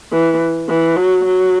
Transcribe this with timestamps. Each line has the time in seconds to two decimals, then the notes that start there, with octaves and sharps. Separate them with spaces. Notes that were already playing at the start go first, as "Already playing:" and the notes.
0.12 E3
0.69 E3
0.96 F#3
1.25 F#3